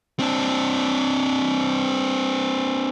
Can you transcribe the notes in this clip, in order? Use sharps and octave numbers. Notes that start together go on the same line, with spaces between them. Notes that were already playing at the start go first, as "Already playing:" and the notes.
C4 D4